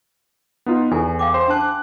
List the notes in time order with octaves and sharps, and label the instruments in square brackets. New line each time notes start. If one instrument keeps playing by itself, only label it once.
[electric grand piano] B3 D#4 F4
[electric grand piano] E2 [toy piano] A4 G#5
[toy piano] F5 G5 D6
[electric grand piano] C5 C6
[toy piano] D4 A5 [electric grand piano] D6 F#6